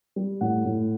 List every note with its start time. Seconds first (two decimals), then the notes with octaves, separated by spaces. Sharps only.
0.16 G3
0.41 A2 F#5
0.65 A2